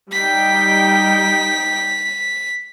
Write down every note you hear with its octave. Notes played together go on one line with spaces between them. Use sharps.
G3 D#4 G5 B6